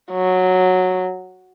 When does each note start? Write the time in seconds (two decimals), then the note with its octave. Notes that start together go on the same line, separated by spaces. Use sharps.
0.11 F#3